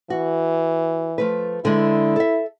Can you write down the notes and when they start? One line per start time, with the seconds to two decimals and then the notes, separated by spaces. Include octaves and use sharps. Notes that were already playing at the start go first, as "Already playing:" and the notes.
0.10 E3 F#4
1.18 F3 A3 B4
1.65 D3 G#3 E4
2.16 A4 E5